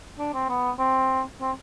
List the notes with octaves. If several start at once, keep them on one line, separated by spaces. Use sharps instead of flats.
D4
C4
B3
C4
C4